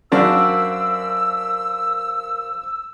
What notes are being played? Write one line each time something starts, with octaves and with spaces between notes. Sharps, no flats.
F#2 D4 F#4 A#4 C5 F5 E6